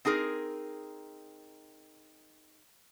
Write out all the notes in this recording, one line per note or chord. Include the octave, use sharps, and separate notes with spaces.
C4 D#4 G#4 A#4